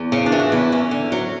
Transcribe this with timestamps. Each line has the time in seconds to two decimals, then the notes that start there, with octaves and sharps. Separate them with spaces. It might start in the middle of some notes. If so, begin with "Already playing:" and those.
Already playing: E2
0.12 C#3 C#4
0.26 D4
0.32 E3
0.39 F#4
0.52 E2 E4
0.72 E2 C#4
0.91 D3
1.12 F#3